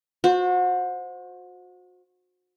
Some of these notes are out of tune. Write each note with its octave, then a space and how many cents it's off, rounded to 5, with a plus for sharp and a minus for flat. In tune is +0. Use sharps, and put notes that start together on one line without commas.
F#4 -35 C5 +0